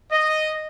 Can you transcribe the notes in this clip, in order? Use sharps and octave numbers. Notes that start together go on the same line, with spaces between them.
D#5